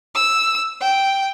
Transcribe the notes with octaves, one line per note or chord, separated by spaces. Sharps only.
E6
G5